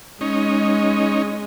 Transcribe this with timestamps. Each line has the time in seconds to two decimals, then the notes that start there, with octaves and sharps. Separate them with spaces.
0.21 G#3 C#4 D#4